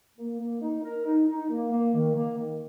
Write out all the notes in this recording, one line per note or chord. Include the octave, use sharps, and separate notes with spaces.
A#3
A#3
D#4
A#4
D#4
D#4
A#3
A#3
D#3
A#3
D#3